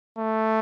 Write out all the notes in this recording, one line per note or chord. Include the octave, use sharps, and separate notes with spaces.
A3